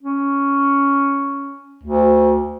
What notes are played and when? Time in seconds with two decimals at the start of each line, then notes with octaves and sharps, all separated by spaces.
0.03 C#4
1.83 D2